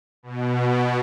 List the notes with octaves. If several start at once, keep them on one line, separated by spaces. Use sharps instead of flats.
B2